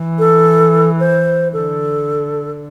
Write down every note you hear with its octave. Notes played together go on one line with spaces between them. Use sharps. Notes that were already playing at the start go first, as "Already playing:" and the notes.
Already playing: E3
A4
C5
D3 A4